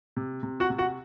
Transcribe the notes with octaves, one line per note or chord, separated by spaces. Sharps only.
C3
C3
F#4 F#5
C3
F#4 F#5